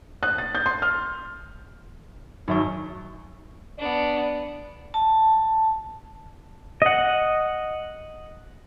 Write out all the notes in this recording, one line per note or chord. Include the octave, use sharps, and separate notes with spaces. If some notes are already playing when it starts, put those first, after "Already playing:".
F#6
A6
G6
C6
F6
G#1 F#2 F#3 D#4 E5 C#6
B3 D4 D5
A5
D#5 F#5